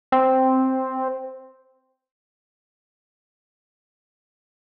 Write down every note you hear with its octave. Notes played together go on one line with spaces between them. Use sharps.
C4